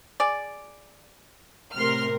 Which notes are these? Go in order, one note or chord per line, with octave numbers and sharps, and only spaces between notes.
G#4 D5
A2 C3 A#4 C6 F6